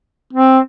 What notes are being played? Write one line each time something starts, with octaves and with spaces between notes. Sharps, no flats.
C4